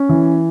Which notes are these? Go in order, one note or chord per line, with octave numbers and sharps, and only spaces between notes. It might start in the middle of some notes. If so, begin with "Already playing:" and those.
Already playing: C#4
E3